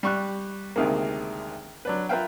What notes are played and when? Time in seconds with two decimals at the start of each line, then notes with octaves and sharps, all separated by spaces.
0.03 G3 C#6 F#6
0.76 D2 C3 D#3 G#3 A#3
1.85 F#3 D4 B4
2.09 F4 A#4 B4 E5 F5 G5